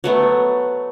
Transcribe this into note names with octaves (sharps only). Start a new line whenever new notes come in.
F#3 A3 B3